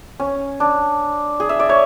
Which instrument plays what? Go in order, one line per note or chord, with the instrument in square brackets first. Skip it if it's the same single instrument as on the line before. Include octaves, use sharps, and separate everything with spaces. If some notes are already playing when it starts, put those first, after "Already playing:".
[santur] C#4
D4
G#4
E5
D5
C#5